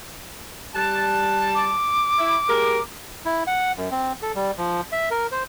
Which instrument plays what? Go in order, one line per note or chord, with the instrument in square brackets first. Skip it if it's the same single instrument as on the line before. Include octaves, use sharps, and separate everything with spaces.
[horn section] G3 A5 [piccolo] F#6
[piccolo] D6
[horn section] E4
G#3 G4 A#4
[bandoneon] E4
F#5
F#2
C4
A4
G3
F3
E5
A#4
C5